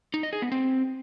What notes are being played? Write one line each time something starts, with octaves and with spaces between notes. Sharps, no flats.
D#4
D#5
G#4
B3
C4